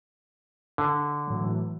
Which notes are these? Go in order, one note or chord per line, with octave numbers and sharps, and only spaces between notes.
D3
A2 E3 F#3